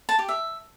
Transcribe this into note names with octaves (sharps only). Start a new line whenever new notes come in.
A5
G4
E5